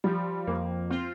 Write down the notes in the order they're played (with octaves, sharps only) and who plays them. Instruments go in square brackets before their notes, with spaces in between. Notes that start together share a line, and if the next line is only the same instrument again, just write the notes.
[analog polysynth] F3 [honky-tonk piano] G3
[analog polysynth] F2 [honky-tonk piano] A#3
[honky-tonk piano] C4 [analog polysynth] F4